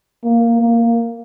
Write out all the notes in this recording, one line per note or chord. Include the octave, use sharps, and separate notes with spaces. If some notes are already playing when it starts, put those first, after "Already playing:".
A#3
A#3